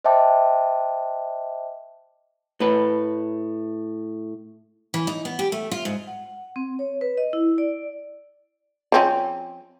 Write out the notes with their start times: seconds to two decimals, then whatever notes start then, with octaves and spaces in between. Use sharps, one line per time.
0.04 C5 D#5 E5 G5 A5 D6
2.60 A2 B4
4.94 E3
5.07 D#4
5.25 B3
5.39 G4
5.52 A3
5.71 F4
5.85 G#2
6.07 F#5
6.56 C4
6.79 C#5
7.01 B4
7.17 D#5
7.33 E4
7.58 D5
8.92 F3 C4 C#4